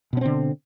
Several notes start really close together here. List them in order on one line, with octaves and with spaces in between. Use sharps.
B2 C#4 C4 D3